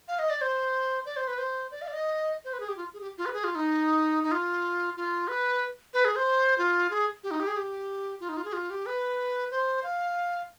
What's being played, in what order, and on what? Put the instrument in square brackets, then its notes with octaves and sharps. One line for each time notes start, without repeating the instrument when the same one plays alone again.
[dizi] F5
D#5
D5
C5
D5
C5
B4
C5
D5
F5
D5
D#5
C5
B4
G#4
G4
F4
G#4
G4
F4
B4
G#4
F4
D#4
D#4
F4
F4
B4
B4
G#4
C5
F4
G#4
G4
D#4
G4
G#4
G4
F4
D#4
F4
G#4
F4
G4
B4
C5
F5